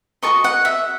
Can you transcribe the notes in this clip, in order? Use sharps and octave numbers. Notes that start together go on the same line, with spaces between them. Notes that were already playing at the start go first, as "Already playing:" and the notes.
F#4 A4 D#5 C#6
F#5
E5